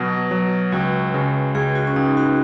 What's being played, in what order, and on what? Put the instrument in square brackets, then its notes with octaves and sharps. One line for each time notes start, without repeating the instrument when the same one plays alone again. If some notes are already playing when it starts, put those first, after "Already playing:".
Already playing: [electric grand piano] B2 F#3 [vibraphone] B4
[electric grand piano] F#3
[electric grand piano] C#2 [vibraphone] F#4
[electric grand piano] C#3
[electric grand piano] C#2 [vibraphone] G#4
[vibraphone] F#4
C#4
[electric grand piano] C#2 [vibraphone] D#4
[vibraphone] F#4